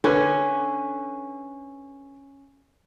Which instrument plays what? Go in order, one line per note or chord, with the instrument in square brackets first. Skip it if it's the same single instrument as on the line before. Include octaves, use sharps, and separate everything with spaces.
[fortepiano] D3 B4 G#5 [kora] C#4